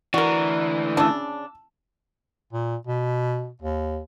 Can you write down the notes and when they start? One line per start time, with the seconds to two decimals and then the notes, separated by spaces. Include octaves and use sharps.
0.14 D3 E3 A3 F#4 A#4 D5
0.97 C#3 D4 A5 E6
2.53 A#2
2.87 B2
3.62 D#2